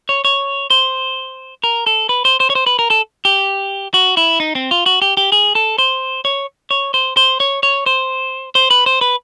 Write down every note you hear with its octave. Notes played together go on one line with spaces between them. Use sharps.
C#5
C#5
C5
A#4
A4
B4
C5
C5
C#5
C5
B4
A#4
A4
G4
F#4
E4
D#4
C4
F4
F#4
G4
G4
G#4
A4
C5
C#5
C#5
C5
C5
C#5
C#5
C5
C5
B4
C5
B4